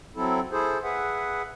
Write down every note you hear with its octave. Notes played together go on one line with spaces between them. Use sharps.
F#3 C4 E4 A4
E4 G#4 A4 C5
G#4 B4 E5 F#5